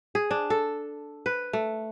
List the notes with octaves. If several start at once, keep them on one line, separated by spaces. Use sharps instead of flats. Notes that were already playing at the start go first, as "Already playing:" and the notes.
G#4
D4
A4
B4
A3